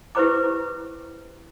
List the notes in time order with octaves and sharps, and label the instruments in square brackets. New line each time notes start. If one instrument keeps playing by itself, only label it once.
[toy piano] E4 G4 B4 C5 A#5 D6